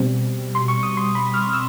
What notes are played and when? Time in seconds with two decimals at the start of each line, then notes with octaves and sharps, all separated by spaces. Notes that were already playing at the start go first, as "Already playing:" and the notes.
Already playing: B2 G3 C4
0.55 C6
0.68 C#6
0.83 D#6
0.97 C6
1.15 B5
1.34 F6
1.53 E6